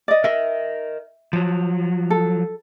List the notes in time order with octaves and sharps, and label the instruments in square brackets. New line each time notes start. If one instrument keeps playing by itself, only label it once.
[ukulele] D5 D#5
[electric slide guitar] A#4 D#5 [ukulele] E5
[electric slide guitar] F3 F#3
[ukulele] A4